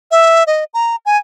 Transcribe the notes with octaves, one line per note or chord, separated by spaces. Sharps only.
E5
D#5
A#5
G#5